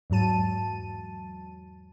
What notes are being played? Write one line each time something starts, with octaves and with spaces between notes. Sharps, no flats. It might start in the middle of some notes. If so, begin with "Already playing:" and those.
E2 G#2 F#3 A5 D#7